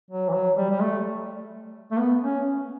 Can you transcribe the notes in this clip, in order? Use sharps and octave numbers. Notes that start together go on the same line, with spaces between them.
F#3
E3
F#3
G3
G3
A3
A3
B3
C#4